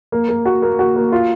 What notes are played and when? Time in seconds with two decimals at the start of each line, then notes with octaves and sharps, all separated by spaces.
0.12 A#3
0.29 A#3
0.46 F#4
0.62 A#3
0.79 F#4
0.96 A#3
1.12 F4